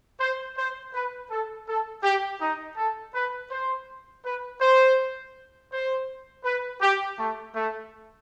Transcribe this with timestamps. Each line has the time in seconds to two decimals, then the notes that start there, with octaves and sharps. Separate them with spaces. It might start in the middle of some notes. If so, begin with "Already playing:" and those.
0.19 C5
0.56 C5
0.93 B4
1.30 A4
1.67 A4
2.03 G4
2.40 D#4
2.76 A4
3.14 B4
3.50 C5
4.24 B4
4.61 C5
5.72 C5
6.44 B4
6.81 G4
7.18 A3
7.55 A3